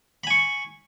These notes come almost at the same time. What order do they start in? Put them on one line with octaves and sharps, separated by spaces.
B5 G#5 C#6